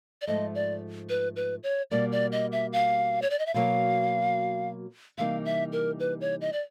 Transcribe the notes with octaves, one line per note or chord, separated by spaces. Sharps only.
D5
G#2 F3 A3 D#5
D5
B4
B4
C#5
B2 G3 A#3 D5
D5
D#5
E5
F5
C#5
D5
D#5
E5
B2 F#3 A#3 F5
C3 E3 G3 A#3 D#4 F5
E5
A#4
B4
C#5
D#5
D5